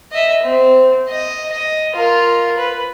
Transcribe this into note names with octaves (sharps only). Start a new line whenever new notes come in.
D#5 E5
C4
D#5
D#5
F4 A#4
B4